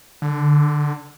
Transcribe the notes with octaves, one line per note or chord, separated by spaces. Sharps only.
D3